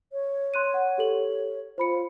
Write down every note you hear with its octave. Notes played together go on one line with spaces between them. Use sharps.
C#5
C6 F#6 D#7
F#5
G4 A4 F#7
F4 C5 B5 C#7